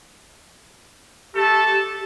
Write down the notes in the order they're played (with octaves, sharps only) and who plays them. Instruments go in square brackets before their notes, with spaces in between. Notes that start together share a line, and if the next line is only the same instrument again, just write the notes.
[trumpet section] A3 A4 A5 [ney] G4